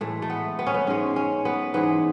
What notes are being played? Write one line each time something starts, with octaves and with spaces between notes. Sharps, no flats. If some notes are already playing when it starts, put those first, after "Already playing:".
A2 E3 G#3 A3
A3
B3
B3
C#4
B3
G#2 G#3 C#4
C#4
B3
G#2 E3 G#3 B3